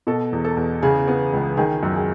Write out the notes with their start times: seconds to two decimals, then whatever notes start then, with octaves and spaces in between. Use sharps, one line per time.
0.07 B2 A4
0.33 E2
0.45 A4
0.57 E2
0.83 C#3 G#4
1.08 B3
1.33 C#2
1.57 D#3 G#4
1.83 F#2
1.96 G#4